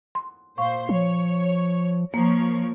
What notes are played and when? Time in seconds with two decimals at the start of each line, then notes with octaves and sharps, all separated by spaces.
0.15 C6
0.58 A#2 C5 F5 C6 C#6
0.89 F3 C#5
2.14 F3 A#3 A#4 C#5